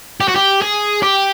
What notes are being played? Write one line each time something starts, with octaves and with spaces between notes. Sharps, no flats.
G4
F#4
G4
G#4
G4